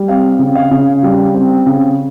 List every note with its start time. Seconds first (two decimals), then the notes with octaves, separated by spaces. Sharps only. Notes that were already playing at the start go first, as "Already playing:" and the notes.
Already playing: G3
0.08 C4 F5
0.39 C#3
0.55 F5
0.71 C#3
1.03 G3
1.34 C4
1.66 C#3